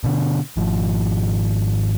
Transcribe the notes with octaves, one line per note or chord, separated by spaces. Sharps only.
B2 D3
G#1 F3